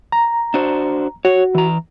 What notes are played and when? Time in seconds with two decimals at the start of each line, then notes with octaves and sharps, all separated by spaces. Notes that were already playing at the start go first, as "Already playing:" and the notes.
0.12 A#5
0.54 D4 F#4 C5
1.25 F#4 C#5
1.55 E3 A#5